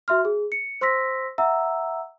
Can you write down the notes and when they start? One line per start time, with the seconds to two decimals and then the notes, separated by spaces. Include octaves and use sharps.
0.08 F#4 E5 C6 F6
0.25 G#4
0.52 C#7
0.81 C5 C6 E6 A#6 B6
1.38 E5 F#5 A#5 E6